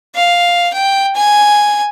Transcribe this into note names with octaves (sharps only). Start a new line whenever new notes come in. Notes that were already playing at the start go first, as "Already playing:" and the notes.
F5
G5
G#5